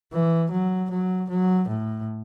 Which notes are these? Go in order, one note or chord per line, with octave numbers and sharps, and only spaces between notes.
E3
F#3
F#3
F#3
A2